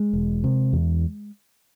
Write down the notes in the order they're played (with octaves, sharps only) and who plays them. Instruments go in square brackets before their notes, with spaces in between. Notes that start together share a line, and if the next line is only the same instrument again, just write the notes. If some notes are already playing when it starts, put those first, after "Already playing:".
Already playing: [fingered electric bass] G#3
E1
C3
E2